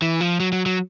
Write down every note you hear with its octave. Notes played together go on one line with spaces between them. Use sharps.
E3
F3
F#3
F#3
F#3